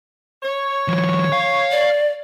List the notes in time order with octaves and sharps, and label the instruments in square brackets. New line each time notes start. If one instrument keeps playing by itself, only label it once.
[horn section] C#5
[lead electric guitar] D#3 F3
F5
[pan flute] D5